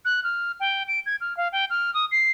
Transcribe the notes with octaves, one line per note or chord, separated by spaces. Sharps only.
F#6
F6
G5
D7
G#6
F6
F5
G5
F6
D#6
C7